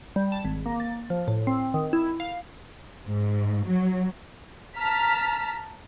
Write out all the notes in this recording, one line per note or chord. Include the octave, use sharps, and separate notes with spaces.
G3
A5
G#1
A#3
A6
F3
A2
C4
D#3
E4
F5
G#2
F#3
A5 A#5 F6 B6